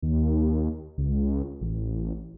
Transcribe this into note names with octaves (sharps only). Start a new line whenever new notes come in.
D#2
C#2
A1